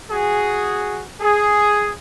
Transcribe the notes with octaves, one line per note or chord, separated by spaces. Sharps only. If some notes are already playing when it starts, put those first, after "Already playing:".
F#4 G#4
G#4